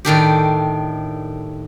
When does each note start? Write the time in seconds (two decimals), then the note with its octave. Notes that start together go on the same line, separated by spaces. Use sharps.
0.05 A2 D#3 D4 G4